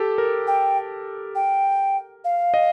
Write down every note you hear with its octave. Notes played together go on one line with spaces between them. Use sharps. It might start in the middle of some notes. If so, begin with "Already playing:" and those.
Already playing: G4 A4
A#4
G5
G5
F5
D#5